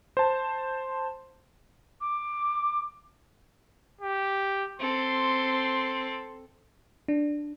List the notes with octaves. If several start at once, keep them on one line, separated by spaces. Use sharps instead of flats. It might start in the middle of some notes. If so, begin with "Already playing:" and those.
C5 A5
D6
G4
C4 A4 C6
D4